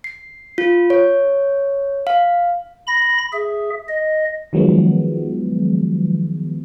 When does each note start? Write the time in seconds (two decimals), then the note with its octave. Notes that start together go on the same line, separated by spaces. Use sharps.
0.04 C7
0.58 F4
0.90 C#5
2.07 F5
2.87 B5 A#6
3.33 G#4 E5
3.88 D#5
4.53 D#3 F3 F#3 G#3 B3